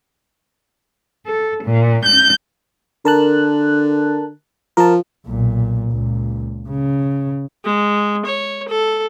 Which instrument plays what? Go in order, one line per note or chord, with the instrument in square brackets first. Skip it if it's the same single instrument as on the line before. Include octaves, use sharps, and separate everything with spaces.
[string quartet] A4
A#2
G6
[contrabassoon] D3 [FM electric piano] A#4 A5 F#6
[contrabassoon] F3 [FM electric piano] A#4 A5
[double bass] B1 A#2
C#2 A#2
C#3
[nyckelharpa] G#3
C#5
A4